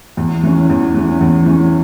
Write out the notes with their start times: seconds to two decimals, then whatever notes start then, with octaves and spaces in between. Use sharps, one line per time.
0.17 E2
0.43 E3 C#4
0.69 E2
0.94 E3 C#4
1.21 E2
1.46 E3 C#4